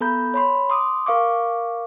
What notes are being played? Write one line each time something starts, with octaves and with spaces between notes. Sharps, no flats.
B3 A4 A#5 B5 G6
C#5 B5 C6
C6 D6 D#6
A#4 F5 C#6 D6